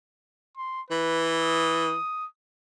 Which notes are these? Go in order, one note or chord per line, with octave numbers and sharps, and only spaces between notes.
C6
E3 B4
D#6